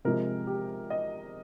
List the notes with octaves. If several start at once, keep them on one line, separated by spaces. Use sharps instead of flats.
C3 F3 G#3 A#4
G4
D#5